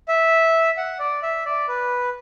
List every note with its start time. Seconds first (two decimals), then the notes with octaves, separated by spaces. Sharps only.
0.08 E5
0.77 F#5
0.99 D5
1.23 E5
1.45 D5
1.68 B4